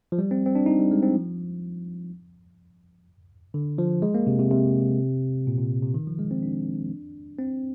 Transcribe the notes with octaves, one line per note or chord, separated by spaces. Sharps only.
F3
G3
C4
C4
D4
D#4
G3
G#3
C4
F3
D3
F3
G#3
A#3
C3
C3
C3
A#2
A#2
C3
D#3
F3
G#3
C4
D4
C4